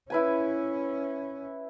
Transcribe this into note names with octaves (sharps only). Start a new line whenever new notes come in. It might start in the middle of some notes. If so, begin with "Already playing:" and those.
C#4 E4 B4 G#5